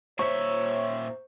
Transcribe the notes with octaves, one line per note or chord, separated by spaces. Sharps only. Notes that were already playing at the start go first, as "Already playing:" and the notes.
A#2 C5 C#5 E5 C#6